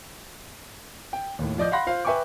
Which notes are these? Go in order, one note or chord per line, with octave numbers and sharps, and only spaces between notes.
G5
D#2 A2
F3 D5 D#5 G6
F5 F#5 B5 C6 F#6 A#6
F4 C5 F5
B4 E5 G5 G#5 C#6 D6